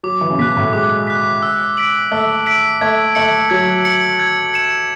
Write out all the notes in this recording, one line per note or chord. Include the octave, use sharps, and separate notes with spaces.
F#3 D6
E3
C#3
B2 F#6 B6
A2
G#3 D6
F#6 B6
E6
B6 D7 F#7
A3 E6
B6 D7 F#7
A3 G#6
A3 C#7 F#7
F#3 G#6
C#7 F#7
G#6
C#7 E7